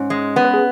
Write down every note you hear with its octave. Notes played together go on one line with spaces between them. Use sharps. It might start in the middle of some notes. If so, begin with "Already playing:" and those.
Already playing: G#2 C#4
G#3
B3
B4
G#4